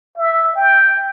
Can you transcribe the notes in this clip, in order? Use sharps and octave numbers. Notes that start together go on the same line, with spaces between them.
E5
G5